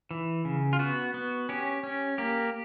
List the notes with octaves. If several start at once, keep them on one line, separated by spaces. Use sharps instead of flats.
E3
C#3
F4
B3 F#4
B3
C#4 G4
C#4
A#3 G4